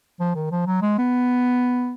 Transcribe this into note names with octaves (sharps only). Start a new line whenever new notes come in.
F3
D#3
F3
F#3
G#3
B3